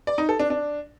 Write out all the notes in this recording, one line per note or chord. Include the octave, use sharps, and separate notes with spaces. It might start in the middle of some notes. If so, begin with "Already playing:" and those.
D5
D#4
A4
D4
D4